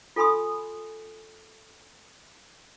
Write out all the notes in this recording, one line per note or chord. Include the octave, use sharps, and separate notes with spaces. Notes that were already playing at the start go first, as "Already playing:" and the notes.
F4 A4 G#5 B5 C6 D#6